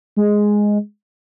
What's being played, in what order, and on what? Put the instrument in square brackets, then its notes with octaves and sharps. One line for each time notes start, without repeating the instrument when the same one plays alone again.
[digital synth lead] G#3